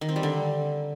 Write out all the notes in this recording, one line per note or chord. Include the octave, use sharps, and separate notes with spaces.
D#3
C4
G3
D3